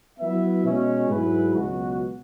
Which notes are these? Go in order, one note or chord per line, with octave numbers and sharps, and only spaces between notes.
F#3 B3 E4 B4 E5
B2 G#3 C#4
G#2 F#3 E4 G#4 B4
C#2 B2 F#3 B3 F#4